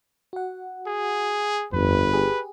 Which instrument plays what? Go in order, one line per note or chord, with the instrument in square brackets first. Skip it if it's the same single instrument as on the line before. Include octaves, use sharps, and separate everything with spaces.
[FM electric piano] F#4 F#5
[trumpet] G#4
[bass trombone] G1 [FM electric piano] F2 [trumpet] B4
[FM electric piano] G4 G#4